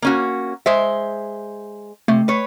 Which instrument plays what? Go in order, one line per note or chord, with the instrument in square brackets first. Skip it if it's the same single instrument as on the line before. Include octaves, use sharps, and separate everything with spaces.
[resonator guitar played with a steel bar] A#3 C#4 F#4
G#3 C5 E5
[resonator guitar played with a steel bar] C3 [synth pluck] A3
[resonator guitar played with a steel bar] B4 C#5